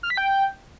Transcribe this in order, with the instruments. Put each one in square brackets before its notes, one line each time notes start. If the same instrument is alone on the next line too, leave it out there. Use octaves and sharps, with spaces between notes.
[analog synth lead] F6
B6
G5